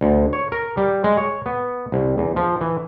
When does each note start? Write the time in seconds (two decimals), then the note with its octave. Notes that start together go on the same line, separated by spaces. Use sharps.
0.01 D2
0.33 C#5
0.52 A#4
0.77 G3
1.04 G#3
1.17 C#5
1.46 B3
1.92 C2
2.18 E2
2.36 F3
2.61 E3